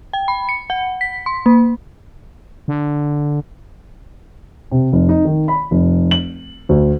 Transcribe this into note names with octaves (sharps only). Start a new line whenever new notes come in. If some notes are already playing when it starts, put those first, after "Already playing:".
G5
B5
C#7
F#5
B6
C6
A#3
D3
C3
F1
D#4
D#3
B5
F1
F#7
D2